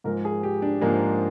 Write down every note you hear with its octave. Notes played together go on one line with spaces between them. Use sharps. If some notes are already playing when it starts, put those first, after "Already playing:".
G#2 F3 G#3 A#4
G#4
G4
D4
G#2 F3 G#3 A#3